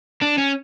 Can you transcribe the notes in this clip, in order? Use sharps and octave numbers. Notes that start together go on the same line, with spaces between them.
D4
C#4